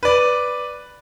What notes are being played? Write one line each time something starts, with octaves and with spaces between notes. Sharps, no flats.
B4 D5